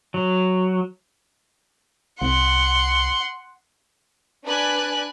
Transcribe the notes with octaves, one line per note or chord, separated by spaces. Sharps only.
F#3
C2 F#5 C6
D4 B4 D5 G#5 F#6